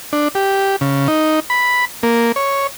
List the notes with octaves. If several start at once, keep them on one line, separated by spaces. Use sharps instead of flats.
D4
G4
C#3
D#4
B5
A#3
C#5